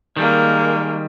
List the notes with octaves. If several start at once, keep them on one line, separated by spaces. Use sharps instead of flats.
D#3 G3 G#3 A#3